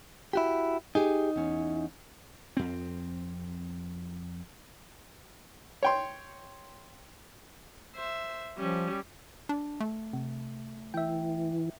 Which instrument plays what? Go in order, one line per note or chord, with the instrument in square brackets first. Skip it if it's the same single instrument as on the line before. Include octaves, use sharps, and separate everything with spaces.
[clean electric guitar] E4 F#4 G4
[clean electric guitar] D#4 [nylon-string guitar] G4 G#4 G#5
[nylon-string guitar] E2 C#4
[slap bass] F2 C4
[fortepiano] C#5 G5 C6
[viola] C5 E5
[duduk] F3 [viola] G3 C#4
[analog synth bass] D4
A3
[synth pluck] C3
[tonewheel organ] E3 [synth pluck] E5 G5